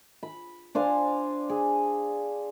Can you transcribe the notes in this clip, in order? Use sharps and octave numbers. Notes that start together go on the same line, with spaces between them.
B5
D4 C5 F5 G#5
G#4